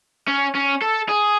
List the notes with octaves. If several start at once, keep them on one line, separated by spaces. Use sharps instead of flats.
C#4
C#4
A4
G#4